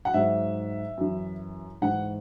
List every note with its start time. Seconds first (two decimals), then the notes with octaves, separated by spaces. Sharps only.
0.05 F#5
0.14 G#2 F#3 E5
0.98 F#2 E3
1.81 G#2 E3 F#5